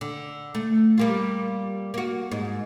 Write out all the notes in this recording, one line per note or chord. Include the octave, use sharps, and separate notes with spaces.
D3
A3
G3 A#3 F4
A#3 F#4
G#2